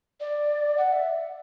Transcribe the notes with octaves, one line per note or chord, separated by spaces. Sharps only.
D5
F#5
E5